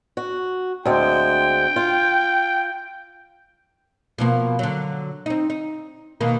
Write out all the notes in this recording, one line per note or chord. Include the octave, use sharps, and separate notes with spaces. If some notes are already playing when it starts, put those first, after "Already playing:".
F#4
D2 G#3 C4 G5
F4
B2 F3 A#3
D3 F#3
C4 D#4
D#4
B2 D#3 A#3